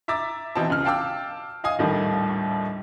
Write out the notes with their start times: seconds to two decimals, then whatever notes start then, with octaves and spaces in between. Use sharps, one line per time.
0.08 E5 A#5 D6 E6 A6
0.55 B2 E3 C4 G5 A5
0.70 C#2 F6
0.84 F5 G5 A5 D6 E6
1.64 D#5 F5 G#5 D#6
1.79 A#1 D#2 A2 D#3 G3